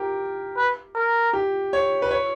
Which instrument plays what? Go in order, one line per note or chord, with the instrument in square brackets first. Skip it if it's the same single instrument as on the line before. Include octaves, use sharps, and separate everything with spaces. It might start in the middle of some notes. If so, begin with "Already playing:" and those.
Already playing: [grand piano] G4 A#4
[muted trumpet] B4
A#4
[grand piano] G4
C#5
B4
C#5